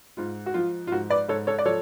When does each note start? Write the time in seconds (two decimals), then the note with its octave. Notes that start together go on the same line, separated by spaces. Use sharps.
0.17 G#2 F4
0.46 F#4
0.54 F3 F4
0.87 F4
0.92 G#2 F#4
1.10 B4 D5
1.29 G#2 A4 C#5
1.47 A4 C#5
1.59 D5
1.65 F3 A4 C#5